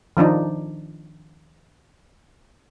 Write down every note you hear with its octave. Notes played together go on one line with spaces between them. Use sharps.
D#3 F3 D4 D#4